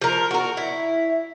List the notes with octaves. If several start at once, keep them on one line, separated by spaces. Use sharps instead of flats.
F3 A#4
F#4 A#4
E4